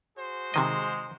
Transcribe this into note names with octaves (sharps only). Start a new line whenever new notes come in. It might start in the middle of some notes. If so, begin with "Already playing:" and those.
F#4 G#4 C5
C3 D#3 G#3 D#5